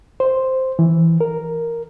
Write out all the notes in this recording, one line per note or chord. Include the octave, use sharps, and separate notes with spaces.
C5
E3
A#4